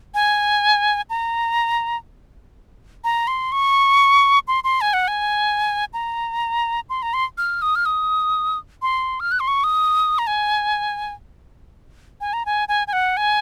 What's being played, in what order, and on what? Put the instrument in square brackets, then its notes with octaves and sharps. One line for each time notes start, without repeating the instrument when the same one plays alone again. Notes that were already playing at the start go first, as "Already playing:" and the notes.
[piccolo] G#5
A#5
A#5
C6
C#6
C6
C6
G#5
F#5
G#5
A#5
C6
A#5
C6
F6
D#6
F6
D#6
C6
F6
F#6
C6
C#6
D#6
A#5
G#5
G#5
A#5
G#5
G#5
G#5
F#5
G#5